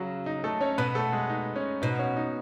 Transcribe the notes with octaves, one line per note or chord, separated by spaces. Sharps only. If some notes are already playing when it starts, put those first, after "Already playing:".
Already playing: C#3 F#3 F#4
D#4
A3 A4
C#4 C#5
B2 B3 B4
A3 A4
G#3 G#4
D#4
C#4
B2 D#4
C#4
D#4